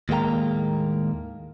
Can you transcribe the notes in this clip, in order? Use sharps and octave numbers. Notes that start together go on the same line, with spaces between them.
D#2 A2 G#3 A#3 G5 A#5